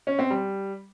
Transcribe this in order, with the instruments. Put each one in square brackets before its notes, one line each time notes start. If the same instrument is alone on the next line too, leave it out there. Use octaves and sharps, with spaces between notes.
[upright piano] C#4
C4
G3